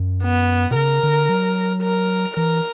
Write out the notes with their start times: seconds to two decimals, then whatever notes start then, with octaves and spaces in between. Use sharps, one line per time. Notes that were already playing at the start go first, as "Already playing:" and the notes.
Already playing: F#2
0.23 B3
0.71 B2
0.75 C#3 A#4
1.03 D3
1.29 F#3
1.83 A#4
2.37 E3 A#4